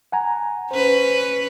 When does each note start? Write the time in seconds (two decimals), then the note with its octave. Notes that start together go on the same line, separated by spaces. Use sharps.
0.12 F#5 G#5 A#5
0.71 C#4 B4 C5